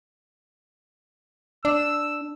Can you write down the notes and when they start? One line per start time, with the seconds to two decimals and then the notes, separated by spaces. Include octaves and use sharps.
1.65 D4 E6